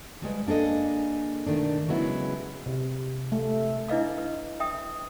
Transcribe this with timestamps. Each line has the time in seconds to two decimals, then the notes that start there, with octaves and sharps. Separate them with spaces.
0.22 F3 G3 G#3 B4
0.47 A#3 D4 G#4 A4 D#5
1.47 B2 D#3 A3 D4
1.88 C#3 F#3 G#3 B3 E4
2.66 C3
3.32 A3
3.88 D4 E4 B4 D#5 F5 D6
4.18 B4
4.60 E5 G5 D#6